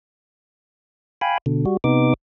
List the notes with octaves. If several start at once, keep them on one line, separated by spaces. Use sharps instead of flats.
F5 G5 G#5 B5
B2 D3
G3 F#4
C3 B3 D#4 D6